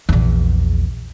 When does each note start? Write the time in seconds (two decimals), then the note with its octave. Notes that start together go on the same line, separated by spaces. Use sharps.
0.09 A#1 E2